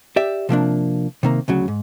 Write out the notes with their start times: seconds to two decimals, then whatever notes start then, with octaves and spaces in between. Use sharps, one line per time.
0.16 G4 D5 E5
0.49 C3 F3 A#3 D4
1.23 C3 D#3 A#3
1.48 D2 C#3 F#3
1.68 G#2